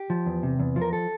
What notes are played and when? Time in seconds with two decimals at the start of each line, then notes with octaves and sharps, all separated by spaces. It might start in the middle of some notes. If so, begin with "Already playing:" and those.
Already playing: G4
0.10 F3
0.26 E2
0.43 C3
0.59 E2
0.76 F3
0.82 A#4
0.93 A4